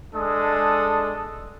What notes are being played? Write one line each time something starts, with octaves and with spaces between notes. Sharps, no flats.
G#3 D4 A4 D#6